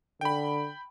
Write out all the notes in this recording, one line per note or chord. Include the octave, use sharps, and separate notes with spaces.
D3 G5 B5